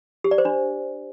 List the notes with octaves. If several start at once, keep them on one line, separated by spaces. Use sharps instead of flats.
G4
D5
C5
D4